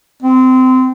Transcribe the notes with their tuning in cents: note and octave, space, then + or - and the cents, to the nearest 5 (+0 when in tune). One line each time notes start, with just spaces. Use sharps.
C4 -25